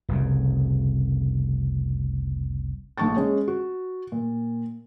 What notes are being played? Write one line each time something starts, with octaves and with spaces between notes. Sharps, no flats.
F1 C2 C#3
A#1 D3 A5 C#6 A6
G#3 C#4
F#4
A#2